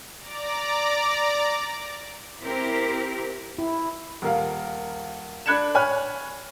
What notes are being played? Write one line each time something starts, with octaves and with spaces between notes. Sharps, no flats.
D5 A#5 D6
C4 E4 G4 A#4 C5
E4
D#1 A#4 F5
D4 B5 F#6 G#6 C#7 E7
C#5 G#5 B5 F6 F#6